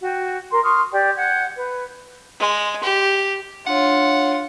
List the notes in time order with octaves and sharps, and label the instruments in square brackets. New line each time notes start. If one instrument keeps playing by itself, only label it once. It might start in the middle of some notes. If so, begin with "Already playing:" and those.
[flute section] F#4 G5
A#4 C6
C6 C#6 D#6 F6
G4 D5 G5
F#5 G6 G#6
B4
[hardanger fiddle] G#3
G4
[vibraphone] D4 C#5 [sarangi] F4 [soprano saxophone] F#5